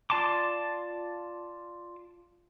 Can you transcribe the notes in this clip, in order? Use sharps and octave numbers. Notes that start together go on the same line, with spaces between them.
F4 D5 A5 C6 D6